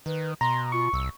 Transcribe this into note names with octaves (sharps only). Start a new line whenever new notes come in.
D#3 B4
B2 A#5 C6
F4 C#6
C2 E6